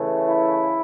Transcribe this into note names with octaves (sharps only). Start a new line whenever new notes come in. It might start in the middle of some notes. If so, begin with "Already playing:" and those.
Already playing: C#3 E3 A3
E4